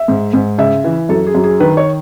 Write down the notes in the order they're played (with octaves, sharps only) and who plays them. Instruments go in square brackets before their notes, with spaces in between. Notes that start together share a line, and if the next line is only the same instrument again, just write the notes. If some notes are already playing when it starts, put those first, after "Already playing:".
Already playing: [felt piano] E5
G#2
G#2
C#3 E5
E3
F#2 A4
G#4
F#2
G#4
D#3 B4
C#5